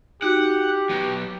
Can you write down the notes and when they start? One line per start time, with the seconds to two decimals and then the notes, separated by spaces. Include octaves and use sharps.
0.22 D#4 F#4 G4 F#5
0.89 F#3 B3